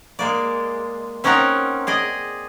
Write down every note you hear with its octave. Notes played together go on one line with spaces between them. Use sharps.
G#3 A#3 D5
C4 C#4 D#4 A#4 F#5 A#5
G#4 D5 D#5